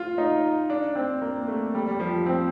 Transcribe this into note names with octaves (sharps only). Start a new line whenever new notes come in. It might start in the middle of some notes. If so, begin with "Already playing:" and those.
Already playing: F4
D#4
D4
C4
A#3
A3
G3
G3
F3
C4